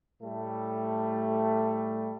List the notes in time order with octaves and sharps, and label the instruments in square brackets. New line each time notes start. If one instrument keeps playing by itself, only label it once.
[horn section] A2 G3 A3